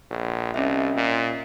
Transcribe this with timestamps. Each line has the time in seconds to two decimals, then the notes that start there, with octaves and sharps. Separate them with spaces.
0.11 A#1
0.54 C2 C#4 D#5 E5
0.96 A#2